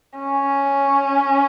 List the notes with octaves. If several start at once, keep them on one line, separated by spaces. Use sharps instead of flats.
C#4